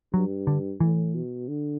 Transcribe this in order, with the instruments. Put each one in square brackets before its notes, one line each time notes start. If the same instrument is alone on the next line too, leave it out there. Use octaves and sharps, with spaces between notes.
[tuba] G2 [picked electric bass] F#3
[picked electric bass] D3
[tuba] A2 [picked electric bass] E3
[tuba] B2
D3